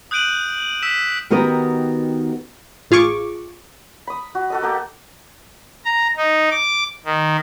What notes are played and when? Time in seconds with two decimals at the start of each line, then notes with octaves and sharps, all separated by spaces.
0.11 D#6 F#6 G6 D7 D#7 F#7
0.82 E6 B6 E7
1.30 D#3 B3 F#4 G4 A#4 D#5
2.91 A1 F4 G#4 C#6 D6
4.07 B5 D#6
4.35 F#4
4.50 F#4 A4 D#5
4.62 A#3 F#4 A4 A#4
5.85 A#5
6.16 D#4
6.51 D6
7.05 D#3